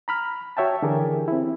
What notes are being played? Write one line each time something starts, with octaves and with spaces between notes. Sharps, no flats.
A#5 B5 F6
F#4 C#5 E5 G5 A5
D3 E3 G4 G#4 A#4
C4 E4